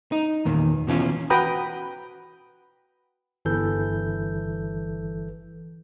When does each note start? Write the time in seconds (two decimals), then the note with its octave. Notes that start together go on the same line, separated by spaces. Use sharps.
0.12 D#4
0.45 E2 A#2 D#3
0.87 B2 E3 C#4 F4
1.30 F#4 B4 G5 A#5 B5 D#6
3.45 G1 E3 A4 G6